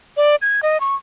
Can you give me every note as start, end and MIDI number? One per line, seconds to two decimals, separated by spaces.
0.17 0.35 74
0.42 0.60 92
0.63 0.80 75
0.80 0.95 85